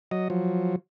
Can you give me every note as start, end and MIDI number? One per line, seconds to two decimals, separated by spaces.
0.11 0.28 54
0.11 0.28 75
0.30 0.76 53
0.30 0.76 54